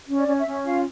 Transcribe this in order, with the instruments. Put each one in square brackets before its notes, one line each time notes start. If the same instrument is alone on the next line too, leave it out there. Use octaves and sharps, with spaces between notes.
[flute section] C#4
D5
C#4
E5
C#4
F4 F5